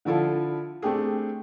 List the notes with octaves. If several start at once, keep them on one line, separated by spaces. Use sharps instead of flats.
D3 F3 E4 F4 A4
A3 C4 D4 G4 G#4